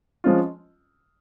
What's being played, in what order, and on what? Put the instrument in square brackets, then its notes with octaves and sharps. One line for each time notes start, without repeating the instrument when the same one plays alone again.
[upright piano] F3 G#3 C#4 F4